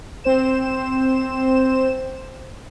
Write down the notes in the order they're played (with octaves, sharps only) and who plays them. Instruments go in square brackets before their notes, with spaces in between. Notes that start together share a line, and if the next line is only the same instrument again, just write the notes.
[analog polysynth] C4 C5 E7